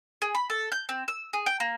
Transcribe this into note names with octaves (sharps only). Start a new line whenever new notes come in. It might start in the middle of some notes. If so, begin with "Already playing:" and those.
G#4
B5
A4
G6
C4
E6
G#4
G5
A#3